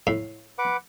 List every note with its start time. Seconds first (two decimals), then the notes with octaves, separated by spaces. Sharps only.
0.07 A2
0.58 B4 F#5 D6